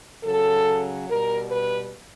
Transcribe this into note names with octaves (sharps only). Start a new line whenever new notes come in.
C#3 F#3 A4
B2 G3 A#4
B4